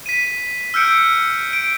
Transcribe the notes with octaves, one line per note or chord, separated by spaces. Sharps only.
B6 D#7
E6 F6 G6 C#7 D7
D7